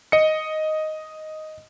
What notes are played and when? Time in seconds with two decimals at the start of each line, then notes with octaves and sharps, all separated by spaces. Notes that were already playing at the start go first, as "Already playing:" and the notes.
0.12 D#5 C#7